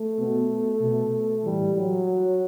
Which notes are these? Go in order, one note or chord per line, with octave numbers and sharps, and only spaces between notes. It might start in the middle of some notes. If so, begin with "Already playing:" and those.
Already playing: A3
B2
B2
A2 E3 G3
F#3